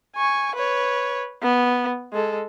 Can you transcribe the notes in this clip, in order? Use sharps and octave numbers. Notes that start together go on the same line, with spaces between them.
G#5 C#6
B4 C#5
B3
G#3 A4